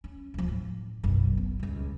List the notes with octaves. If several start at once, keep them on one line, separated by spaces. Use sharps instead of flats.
C#4
D1 F3
A2
F#1 B1
B3
D#1 C#2